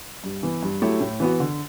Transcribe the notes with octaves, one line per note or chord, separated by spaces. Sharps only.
G2
E3 B3
G2
F#3 A3 E4 G4
A2
E3 B3 F#4
D3